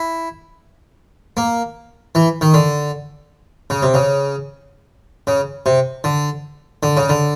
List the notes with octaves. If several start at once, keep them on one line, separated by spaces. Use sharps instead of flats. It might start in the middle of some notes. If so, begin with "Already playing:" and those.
Already playing: E4
A#3
E3
D#3
D3
C#3
C3
C#3
C#3
C3
D3
D3
C#3
D3